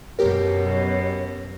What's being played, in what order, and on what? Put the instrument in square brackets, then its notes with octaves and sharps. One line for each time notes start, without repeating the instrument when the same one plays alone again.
[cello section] F#2 B2 [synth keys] G4 A#4 [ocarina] C#5